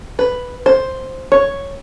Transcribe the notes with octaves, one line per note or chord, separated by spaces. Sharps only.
B4
C5
C#5